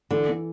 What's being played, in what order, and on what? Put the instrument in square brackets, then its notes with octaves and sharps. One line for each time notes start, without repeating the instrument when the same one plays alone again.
[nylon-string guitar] D3 [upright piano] E3
[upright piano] E3